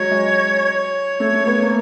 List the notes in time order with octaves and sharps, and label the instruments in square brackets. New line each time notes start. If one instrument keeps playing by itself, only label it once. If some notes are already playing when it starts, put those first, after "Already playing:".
Already playing: [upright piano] F#3 G#3 [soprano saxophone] C#5
[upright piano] G#3
[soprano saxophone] C#5
[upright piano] A3
A3
B3
A#3